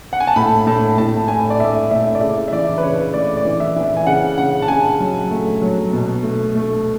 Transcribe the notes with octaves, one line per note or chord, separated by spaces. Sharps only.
F#5
G#5
A5
A2 B5
A2 A5
A2 A5
A2 G#5
D5
A3 E5
A2 E5
D5
C#3 E5
E5
E3 D5
B4
C#3 C#5
A3 D5
D5
E3
E5
E3
E5
G#5
C#3 F#5
C#3 F#5
A5
C#3 G#5
F#3
A3
F#3
B2
A3
A3